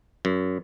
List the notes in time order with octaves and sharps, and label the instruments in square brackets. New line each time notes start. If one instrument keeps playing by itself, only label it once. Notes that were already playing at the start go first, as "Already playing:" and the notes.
[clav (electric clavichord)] F#2